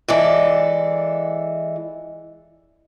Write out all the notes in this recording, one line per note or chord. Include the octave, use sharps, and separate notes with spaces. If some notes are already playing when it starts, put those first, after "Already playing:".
E3 G#3 A4 D5